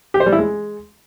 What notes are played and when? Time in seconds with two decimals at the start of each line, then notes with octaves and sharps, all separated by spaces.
0.14 G4
0.20 C5
0.26 G3
0.32 E4
0.39 G#3